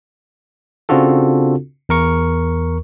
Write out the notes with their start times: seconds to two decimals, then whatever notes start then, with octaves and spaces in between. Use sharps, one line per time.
0.89 C#3 C4 D4 F4 F#4 A4
1.89 E2 A#4 C#6